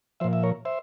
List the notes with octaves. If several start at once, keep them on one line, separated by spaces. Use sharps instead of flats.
A#2 F3 C5 E5
E5
A#4 C#5
C5 E5